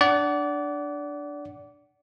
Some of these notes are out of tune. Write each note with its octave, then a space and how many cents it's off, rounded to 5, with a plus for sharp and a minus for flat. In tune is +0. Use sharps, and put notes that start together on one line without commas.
D4 +0 D5 -25 F#5 +20